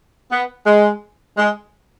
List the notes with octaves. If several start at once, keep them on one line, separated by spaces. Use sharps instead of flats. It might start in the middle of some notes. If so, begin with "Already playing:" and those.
B3
G#3
G#3